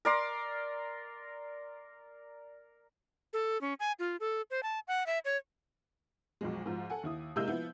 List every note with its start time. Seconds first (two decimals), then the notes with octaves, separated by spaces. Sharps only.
0.05 A#4 D5 C6
3.33 A4
3.61 C#4
3.80 G#5
3.99 F4
4.20 A4
4.51 C5
4.63 A5
4.88 F#5
5.06 E5
5.25 C#5
6.41 B1 F2 G#3
6.66 G#2 F3
6.90 A4 F#5 G#5
7.03 D#2 E4 D#6
7.36 C3 G#3 A#3 E4 E6 G6
7.48 F3 B3 E4